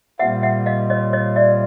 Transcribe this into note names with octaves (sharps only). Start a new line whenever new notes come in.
A#2 G3 C4 F4 E5 F#5
E5 F#5
D#5 F5
C#5 D#5
C#5 D#5
D5 E5